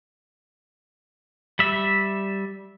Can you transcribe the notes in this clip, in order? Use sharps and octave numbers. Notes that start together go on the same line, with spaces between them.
G3 E5